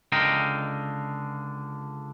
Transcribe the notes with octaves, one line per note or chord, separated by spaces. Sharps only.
C#2 D3 D#5 F5 G5 A#5